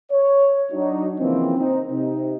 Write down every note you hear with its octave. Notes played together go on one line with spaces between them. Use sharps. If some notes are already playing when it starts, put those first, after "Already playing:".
C#5
F#3 D4 D#4
C#3 E3 F3 A#3 C4
C4 D#4
C3 D#4